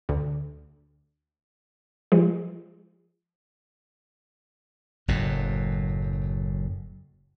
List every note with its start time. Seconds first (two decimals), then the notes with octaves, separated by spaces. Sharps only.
0.09 D2
2.12 F3 G#3
5.08 F#1 F#2 A2